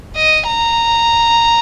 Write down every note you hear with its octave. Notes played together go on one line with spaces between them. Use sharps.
D#5
A#5